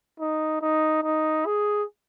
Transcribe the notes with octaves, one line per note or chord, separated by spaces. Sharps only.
D#4
D#4
D#4
G#4